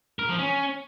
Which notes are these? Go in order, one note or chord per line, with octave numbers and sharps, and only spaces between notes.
A#4
F3
C#4